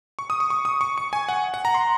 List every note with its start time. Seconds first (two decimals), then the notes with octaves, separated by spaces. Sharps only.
0.19 C#6
0.30 D#6
0.40 C#6
0.50 C#6
0.65 D#6
0.81 C#6
0.98 C#6
1.13 G#5
1.29 F#5
1.54 F#5
1.65 A#5
1.75 C6